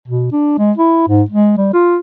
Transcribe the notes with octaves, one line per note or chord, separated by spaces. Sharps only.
B2
D4
G#3
E4
G#2
G#3
G3
F4